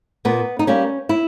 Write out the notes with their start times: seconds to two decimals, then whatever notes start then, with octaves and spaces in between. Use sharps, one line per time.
0.25 A#2 B3
0.59 D#4
0.67 G3 A#3 C#4
1.09 E4